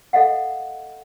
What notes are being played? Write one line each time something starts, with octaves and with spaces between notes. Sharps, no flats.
A4 D#5 F5 F#5